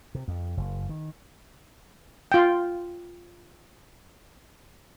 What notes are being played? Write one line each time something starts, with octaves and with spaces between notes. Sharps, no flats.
C3
F2
F#1
D#3
F4 G5